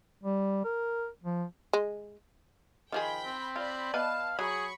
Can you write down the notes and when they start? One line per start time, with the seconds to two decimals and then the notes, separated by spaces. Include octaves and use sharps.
0.23 G3
0.65 A#4
1.24 F3
1.73 G#3
2.92 D#3 F3 G#4 G5 B5
3.25 C4
3.56 F4 D5 B5
3.94 B3 B4 D#5 F5 A5
4.39 F#3 G#4 B5 C#6